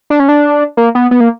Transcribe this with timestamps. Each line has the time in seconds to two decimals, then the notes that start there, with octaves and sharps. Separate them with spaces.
0.10 D4
0.20 C#4
0.28 D4
0.77 A#3
0.95 B3
1.11 B3
1.20 A#3